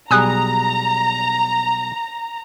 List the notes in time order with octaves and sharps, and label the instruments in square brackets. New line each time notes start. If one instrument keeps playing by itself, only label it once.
[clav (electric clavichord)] B1 G3 G#4 [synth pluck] G#5 D#6 F#6 [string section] A#5